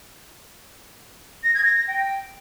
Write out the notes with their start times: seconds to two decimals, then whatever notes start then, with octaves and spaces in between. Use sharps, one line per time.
1.43 A#6
1.54 G#6
1.65 A#6
1.77 A#6
1.88 G5